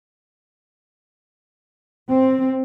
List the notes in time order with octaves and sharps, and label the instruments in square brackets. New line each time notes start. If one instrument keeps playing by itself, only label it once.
[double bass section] C4